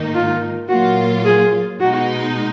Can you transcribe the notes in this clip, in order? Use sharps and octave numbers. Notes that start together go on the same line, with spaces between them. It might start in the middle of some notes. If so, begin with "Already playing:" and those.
Already playing: G#2 D#3 A#3 D#4
F4
A#2 F#3 A#3 F4 F#4
G#4
B2 G#3 D#4 F#4